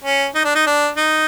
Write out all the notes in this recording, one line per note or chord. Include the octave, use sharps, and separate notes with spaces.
C#4
D#4
D4
D#4
D4
D#4